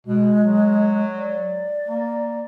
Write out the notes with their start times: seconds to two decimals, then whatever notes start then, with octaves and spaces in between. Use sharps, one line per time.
0.07 B2 G#3
0.41 F#3
1.17 D5
1.88 A#3